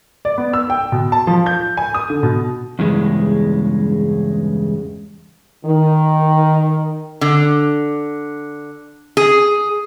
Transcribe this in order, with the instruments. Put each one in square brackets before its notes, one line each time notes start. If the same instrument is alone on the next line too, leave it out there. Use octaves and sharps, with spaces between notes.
[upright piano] D5
B3
E6
G5
B2
A5
F3
G6
G#5
D#6
D3
B2
[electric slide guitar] E2 G2 C#3 G#3
[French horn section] D#3
[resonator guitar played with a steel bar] D3
G#4